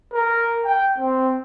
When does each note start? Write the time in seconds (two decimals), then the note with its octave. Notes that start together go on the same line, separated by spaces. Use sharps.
0.13 A#4
0.65 G5
0.98 C4